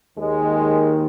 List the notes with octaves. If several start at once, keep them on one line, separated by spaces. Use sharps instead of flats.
D#2 D#3 G#3